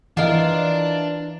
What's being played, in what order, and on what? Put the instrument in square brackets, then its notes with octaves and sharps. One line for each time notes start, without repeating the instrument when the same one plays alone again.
[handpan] E3 [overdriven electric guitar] D4 [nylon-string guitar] E4 D#5 [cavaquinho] F4 A#4